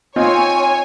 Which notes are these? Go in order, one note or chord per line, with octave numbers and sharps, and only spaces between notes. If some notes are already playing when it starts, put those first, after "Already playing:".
C4 D#4 F4 C#5 G#5